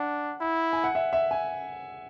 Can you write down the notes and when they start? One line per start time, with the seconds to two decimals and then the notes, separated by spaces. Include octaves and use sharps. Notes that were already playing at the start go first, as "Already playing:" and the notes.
Already playing: D4 F#5
0.40 E4
0.73 G#5
0.84 F#5
0.95 E5
1.13 E5
1.31 G#5